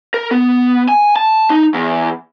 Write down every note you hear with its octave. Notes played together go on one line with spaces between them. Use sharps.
A#4
B3
G#5
A5
D#4
E2